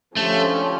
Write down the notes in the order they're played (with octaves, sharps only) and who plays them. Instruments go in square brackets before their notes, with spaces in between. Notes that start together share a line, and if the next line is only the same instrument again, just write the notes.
[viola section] D3 F3 C#4 G4 [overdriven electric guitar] A3